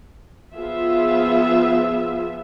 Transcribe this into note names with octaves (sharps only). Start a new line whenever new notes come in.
F3 B3 F4 G#4 E5